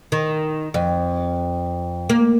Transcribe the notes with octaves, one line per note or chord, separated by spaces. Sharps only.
D#3
F2
A#3